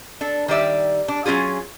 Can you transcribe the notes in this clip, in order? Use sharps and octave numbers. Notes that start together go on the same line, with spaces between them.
D4 A4
D#3 G3 D5 E5
D4
F#3 G3 C#4 F4 G#4